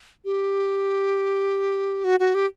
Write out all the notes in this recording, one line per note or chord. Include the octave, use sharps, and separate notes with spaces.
G4
F#4
F#4
G4